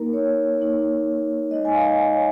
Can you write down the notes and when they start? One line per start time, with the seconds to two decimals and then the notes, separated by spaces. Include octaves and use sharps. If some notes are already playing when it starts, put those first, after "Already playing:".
Already playing: A#3 D#4 A#4
0.13 C#5
0.58 A#3 D#4
1.51 G#3 D#4 D#5
1.65 G#5
1.73 F5
1.81 D#5
2.12 C#5